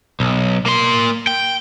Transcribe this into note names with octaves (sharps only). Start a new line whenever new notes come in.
B1
A#3 C6
G5